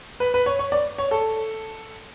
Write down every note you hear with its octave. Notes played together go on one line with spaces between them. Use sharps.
B4
B4
C#5
C#5
D5
C#5
A4